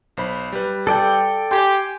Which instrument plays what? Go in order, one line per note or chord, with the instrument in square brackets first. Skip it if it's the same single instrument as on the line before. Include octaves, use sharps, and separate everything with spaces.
[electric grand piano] B1 C5 B5
G3 B4
[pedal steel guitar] A4 D5 G5
[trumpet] G4 [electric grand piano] G#5 C6 G6